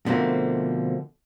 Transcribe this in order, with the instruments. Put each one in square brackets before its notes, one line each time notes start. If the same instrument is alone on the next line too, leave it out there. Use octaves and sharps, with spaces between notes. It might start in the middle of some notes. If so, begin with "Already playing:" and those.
[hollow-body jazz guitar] B2 D3 F3 A3 A#3 C4